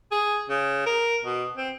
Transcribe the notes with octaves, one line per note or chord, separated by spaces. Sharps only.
G#4
C#3
A#4
B2
C4